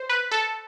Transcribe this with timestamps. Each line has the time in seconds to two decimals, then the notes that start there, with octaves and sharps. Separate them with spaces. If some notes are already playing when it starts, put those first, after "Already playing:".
Already playing: C5
0.09 B4
0.31 A4